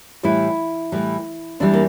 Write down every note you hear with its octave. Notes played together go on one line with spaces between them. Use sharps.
A2 E3 G3 E4
A2 E3 G3
E2 E3 G3 D4
A#3